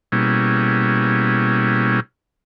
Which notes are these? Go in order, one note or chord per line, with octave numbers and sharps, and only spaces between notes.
B2 G3 A#3 C#4 E4 G#4